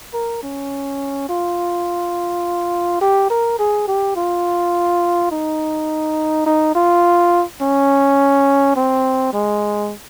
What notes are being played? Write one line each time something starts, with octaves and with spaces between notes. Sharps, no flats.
A#4
C#4
F4
G4
A#4
G#4
G4
F4
D#4
D#4
F4
C#4
C4
G#3